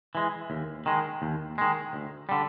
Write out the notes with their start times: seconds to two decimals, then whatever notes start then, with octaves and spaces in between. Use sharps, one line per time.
0.15 E3 G#3
0.50 D#2
0.86 D#3 G#3
1.22 D#2
1.58 D#3 G#3
1.93 D2
2.29 D3 G3